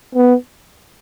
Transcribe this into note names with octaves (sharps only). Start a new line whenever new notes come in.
B3